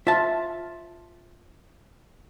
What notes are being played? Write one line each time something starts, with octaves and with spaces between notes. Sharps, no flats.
F4 E5 A5